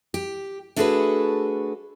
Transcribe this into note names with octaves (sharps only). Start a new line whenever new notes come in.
G4
A3 D4 F#4 G#4 A4 B4